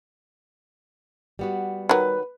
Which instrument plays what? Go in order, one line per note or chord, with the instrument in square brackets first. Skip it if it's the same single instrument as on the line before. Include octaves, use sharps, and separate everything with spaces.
[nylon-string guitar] G3 B3 F#4
[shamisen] D#3 F#3 [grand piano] B4